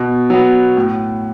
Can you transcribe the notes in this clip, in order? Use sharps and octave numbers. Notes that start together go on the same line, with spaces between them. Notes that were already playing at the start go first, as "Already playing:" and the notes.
Already playing: B2
F#3 B3
A2